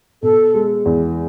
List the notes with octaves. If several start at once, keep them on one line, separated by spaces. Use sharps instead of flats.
B2 A4
G#3
E2